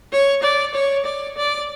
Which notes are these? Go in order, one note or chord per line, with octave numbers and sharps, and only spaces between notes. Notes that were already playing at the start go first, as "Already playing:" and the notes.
C#5
D5
C#5
D5
D5